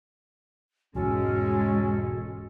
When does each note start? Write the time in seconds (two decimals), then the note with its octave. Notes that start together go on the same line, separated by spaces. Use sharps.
0.95 E1 E2 G#2 G#3 C#4 F#4 A4